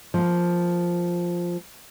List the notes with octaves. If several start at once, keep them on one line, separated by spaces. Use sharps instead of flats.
F3 A#3